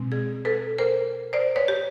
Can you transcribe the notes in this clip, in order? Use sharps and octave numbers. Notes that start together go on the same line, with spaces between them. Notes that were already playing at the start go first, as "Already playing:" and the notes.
Already playing: B2 G#3 C4
G#4
A4 B4
A#4 C5
C5 D5
B4 C#5
G4